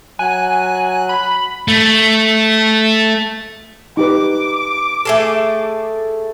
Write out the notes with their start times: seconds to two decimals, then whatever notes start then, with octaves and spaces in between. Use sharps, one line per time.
0.19 F#3 G#5 F#6
1.09 B5
1.68 A3
3.97 D#4 G4 B4 D6
5.05 A3 G#4 A4